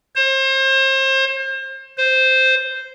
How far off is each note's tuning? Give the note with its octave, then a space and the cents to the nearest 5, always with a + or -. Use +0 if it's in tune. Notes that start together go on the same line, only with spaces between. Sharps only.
C5 +35
C5 -5